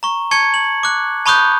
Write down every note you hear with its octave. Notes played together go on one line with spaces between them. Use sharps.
A#5 C#6
A5 C#6 G#6 C#7
F#7
D6 F#6
A5 B5 C#6 D#6 F#6 G6